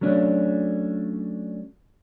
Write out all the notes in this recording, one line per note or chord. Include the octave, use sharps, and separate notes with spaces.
F#3 A3 C#4 D4